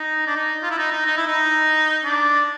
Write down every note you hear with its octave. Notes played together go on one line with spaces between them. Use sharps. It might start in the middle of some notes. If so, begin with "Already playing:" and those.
Already playing: D#4
D4
D#4
F4
E4
D#4
D#4
D#4
E4
D#4
D4